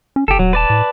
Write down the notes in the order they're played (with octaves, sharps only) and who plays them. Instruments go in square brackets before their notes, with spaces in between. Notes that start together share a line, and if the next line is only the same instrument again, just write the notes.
[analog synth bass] C#4
[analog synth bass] F#1 [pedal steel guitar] G4 A4
[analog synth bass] D#1 [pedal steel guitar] F#3
[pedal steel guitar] B4 D5 A5
[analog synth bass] A2